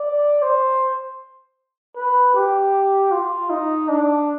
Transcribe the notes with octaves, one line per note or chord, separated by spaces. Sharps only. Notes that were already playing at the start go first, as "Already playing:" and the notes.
Already playing: D5
C5
B4
G4
F4
D#4
D4